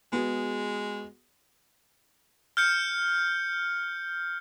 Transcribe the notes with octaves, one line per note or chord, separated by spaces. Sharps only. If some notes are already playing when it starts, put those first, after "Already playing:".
G#3 B3 F#4 G#4
F6 G6 C#7